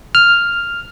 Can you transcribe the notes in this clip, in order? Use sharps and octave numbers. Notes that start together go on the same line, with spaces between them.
F6